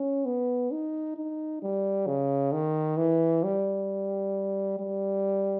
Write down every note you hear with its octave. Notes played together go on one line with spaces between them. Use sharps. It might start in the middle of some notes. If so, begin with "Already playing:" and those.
Already playing: C#4
B3
D#4
D#4
G3
C#3
D#3
E3
G3
G3